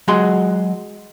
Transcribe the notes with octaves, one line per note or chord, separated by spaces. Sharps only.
F#3 G#3 F#4 G#4 A#5 C6